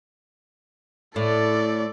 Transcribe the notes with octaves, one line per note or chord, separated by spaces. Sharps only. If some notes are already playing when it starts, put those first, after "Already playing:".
A2 A4 D5